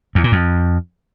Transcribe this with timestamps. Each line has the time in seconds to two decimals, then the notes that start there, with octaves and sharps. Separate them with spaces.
0.15 E2
0.24 A#2
0.32 F2